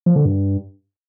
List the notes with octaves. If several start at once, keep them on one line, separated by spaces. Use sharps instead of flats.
F3
D3
G2